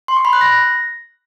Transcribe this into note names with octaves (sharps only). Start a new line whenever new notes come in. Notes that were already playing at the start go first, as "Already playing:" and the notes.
C6
C#6
B5
F#6
A#6